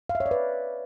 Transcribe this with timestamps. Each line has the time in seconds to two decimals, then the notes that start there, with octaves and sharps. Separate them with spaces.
0.09 F5
0.15 E5
0.20 C#5
0.26 D5
0.31 B4